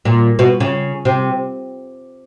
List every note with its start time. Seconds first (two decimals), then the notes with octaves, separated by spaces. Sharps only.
0.05 A#2
0.39 B2
0.60 C#3
1.05 C3